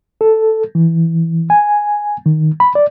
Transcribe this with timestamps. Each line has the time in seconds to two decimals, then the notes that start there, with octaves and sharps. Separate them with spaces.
0.21 A4
0.75 E3
1.50 G#5
2.26 D#3
2.60 B5
2.75 D5